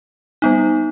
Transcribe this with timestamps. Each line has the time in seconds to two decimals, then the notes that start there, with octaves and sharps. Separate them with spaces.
0.42 G3 B3 D#4